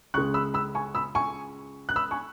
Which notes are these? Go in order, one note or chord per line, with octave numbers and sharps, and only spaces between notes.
C#2 C#3 G#3 C#6 F#6
B5 E6
B5 E6
G#5 C#6
B5 E6
G#5 C#6
F#6
B5 E6
G#5 C#6